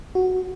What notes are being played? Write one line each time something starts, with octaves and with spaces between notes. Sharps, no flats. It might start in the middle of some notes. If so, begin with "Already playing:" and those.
F#4